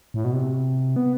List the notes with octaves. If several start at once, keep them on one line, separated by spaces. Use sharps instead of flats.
A2
B2
C3
B3